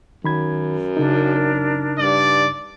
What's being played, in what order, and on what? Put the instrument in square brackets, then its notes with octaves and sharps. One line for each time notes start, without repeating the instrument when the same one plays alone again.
[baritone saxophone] F#2 [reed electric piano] D#3 B5 G#6
[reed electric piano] C#3 D#4 [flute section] D4 A#4
[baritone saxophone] G2 [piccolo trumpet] D5